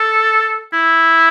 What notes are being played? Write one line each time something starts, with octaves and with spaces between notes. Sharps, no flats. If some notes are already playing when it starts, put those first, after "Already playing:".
Already playing: A4
E4